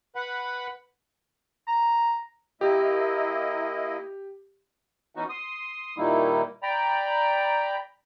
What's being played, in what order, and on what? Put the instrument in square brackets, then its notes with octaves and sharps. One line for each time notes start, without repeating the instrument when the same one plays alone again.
[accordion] B4 F#5 B5
[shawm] A#5
[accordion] A#3 E4 D#5 [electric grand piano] G4
[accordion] E3 B3 C#4 D#4 F#4
C6 D#6
A#2 D#3 G3 A#3 D#4 E4
D5 G5 A#5 B5